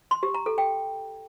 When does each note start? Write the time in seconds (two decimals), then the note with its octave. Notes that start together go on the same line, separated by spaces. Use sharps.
0.11 C6
0.23 G4
0.34 A#5
0.46 A4
0.58 G5